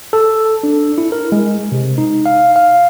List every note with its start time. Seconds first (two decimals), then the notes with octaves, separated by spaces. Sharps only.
0.13 A4
0.63 D4
0.98 E4
1.12 A#4
1.32 G#3
1.72 C3
1.98 D#4
2.26 F5
2.56 F5